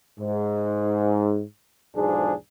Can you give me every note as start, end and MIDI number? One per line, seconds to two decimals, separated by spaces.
0.20 1.42 44
1.96 2.32 35
1.96 2.32 40
1.96 2.32 44
1.96 2.32 53
1.96 2.32 62
1.96 2.32 68